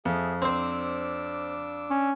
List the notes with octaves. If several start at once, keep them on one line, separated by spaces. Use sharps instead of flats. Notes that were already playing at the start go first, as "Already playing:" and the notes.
F2 G#4 E5
C4 D4 C5 D6 E6
C#4